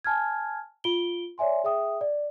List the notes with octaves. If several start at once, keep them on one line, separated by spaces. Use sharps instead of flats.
G#5 A5 F6 G#6
F4 D7 G7
C#5 D5 E5 G#5 C6
G#4 E5 G5 D#6
D5